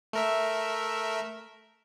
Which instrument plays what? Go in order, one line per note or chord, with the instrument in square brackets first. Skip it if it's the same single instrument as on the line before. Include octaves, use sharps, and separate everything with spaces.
[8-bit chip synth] A3 A#4 E5